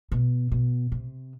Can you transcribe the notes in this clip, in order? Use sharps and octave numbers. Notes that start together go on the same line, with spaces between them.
B2
B2
C3